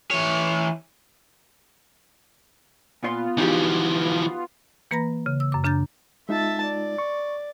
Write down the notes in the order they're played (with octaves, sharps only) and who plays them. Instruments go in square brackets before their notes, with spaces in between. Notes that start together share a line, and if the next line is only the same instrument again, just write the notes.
[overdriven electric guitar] E3 C#5
[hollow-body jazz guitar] A#2 C#5 C6 [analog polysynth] B3 F4
[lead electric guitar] E3 F3 [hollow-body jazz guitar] D#4 F#4 G4
[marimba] E3 A#3 B4 A#5 B5 A#6
C#3
E6
F#2 D6
C#3 D4 A#5 G6 A6
[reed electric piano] G#3 D#4 F4 [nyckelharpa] E5 A5
[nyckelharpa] D5
[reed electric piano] C#6